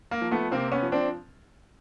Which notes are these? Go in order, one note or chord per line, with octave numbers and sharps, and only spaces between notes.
A#3
F3
A3 B3
C3 A#3 C4
B3 C#4
F3
C4 D4